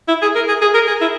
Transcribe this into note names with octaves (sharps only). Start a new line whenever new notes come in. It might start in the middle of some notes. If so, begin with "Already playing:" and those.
E4
G#4
A#4
G#4
G#4
A#4
G#4
E4